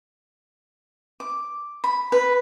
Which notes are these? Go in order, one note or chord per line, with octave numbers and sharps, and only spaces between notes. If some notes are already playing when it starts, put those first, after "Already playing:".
D6
B5
B4